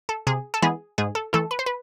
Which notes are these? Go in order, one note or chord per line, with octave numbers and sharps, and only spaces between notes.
A4
C3 G#4
A4
E3 G#3 B3 E4 G#4
G#2 G#4
A4
E3 A3 E4 A4
B4
C5
B4